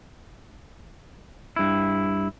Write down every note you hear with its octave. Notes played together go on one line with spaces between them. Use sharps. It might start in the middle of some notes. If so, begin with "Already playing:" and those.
G2 E4